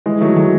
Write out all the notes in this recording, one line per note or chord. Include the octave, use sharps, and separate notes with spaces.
E3 G#3
F#3 A3
F#3 A3